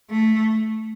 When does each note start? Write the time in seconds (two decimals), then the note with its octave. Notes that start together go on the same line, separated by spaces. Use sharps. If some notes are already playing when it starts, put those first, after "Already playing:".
0.10 A3